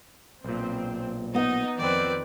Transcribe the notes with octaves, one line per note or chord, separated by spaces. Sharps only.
B1 A#2 C4
B3 D#4 D#5 F#5
F2 D#3 C4 B4 D5